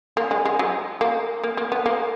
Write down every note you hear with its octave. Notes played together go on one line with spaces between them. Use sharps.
A#3
G#3
G#3
F#3
A#3
A#3
A#3
B3
A#3